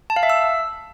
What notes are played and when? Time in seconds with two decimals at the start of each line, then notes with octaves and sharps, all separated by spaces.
0.10 A5
0.16 F5
0.23 E5
0.30 E6